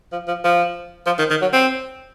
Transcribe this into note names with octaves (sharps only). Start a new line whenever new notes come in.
F3
F3
F3
F3
D#3
D#3
F#3
C4